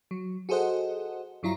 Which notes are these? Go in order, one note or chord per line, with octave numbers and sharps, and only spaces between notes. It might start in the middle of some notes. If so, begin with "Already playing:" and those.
F#3
F#4 G#4 A4 C5 D#5 F#5
G2 F#3 E4 F4 A#5